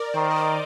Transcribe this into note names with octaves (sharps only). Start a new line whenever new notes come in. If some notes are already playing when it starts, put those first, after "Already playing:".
Already playing: A#4 D5
D#3 C5
D#5
D5